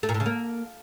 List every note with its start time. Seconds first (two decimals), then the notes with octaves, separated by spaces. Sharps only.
0.03 A3
0.09 A#2
0.14 A2
0.20 C#3
0.26 A#3